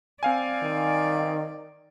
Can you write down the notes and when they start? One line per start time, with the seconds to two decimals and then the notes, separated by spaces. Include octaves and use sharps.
0.23 C4 D5 F5 G#5
0.62 D#3